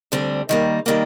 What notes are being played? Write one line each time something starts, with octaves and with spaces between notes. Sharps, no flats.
D2 D3 G3 C4
D#3 G3 A#3
D#3 G3 A#3